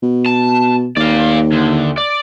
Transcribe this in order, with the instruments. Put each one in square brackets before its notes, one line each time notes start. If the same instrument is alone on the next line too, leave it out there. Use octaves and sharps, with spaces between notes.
[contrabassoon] B2
[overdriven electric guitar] A5
[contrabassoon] D#2 [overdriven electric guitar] D5 F5
[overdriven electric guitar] D2
D5